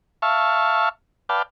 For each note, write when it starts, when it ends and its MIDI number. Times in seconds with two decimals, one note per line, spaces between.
0.22 0.89 76
0.22 0.89 77
0.22 0.89 81
0.22 0.89 85
1.29 1.42 71
1.29 1.42 74
1.29 1.42 77
1.29 1.42 79
1.29 1.42 81